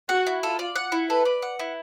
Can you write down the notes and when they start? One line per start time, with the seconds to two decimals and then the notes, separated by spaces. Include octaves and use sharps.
0.09 F#4 F#5
0.27 E4
0.43 F4 A4
0.59 D5
0.76 F#5
0.92 E4
1.09 A4 B4
1.25 D5
1.42 F#5
1.59 E4